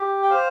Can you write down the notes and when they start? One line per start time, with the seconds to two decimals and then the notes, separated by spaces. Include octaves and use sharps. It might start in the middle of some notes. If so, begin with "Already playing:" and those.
Already playing: G4
0.22 G5
0.30 C5 F5